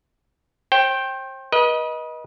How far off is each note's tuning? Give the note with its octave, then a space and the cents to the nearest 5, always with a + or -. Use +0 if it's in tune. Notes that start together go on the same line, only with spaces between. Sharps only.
C5 +40 G5 +0
B4 -35 D#5 +10